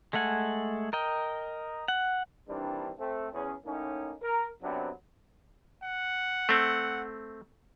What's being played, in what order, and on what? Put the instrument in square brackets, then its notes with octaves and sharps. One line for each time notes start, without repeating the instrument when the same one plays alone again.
[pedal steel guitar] G#3 A3 A4 F#5 G#5
A#4 D#5 G5
F#5
[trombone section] D#3 E3 G3 C4 D4
A3 C4
E2 C#4 G#4
A2 A#3 C#4 D#4
A#4
F#2 C3 F#3 B3 C4 D4
[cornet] F#5
[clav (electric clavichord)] A3 C4